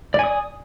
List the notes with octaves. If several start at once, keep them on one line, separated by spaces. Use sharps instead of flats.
D5 G#5 D#6